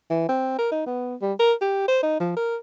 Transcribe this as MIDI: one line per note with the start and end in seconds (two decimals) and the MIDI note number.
0.10 0.28 52
0.29 0.56 60
0.58 0.70 70
0.72 0.84 63
0.86 1.15 59
1.21 1.33 55
1.39 1.53 70
1.61 1.86 67
1.88 2.00 72
2.03 2.20 63
2.20 2.34 53
2.36 2.56 70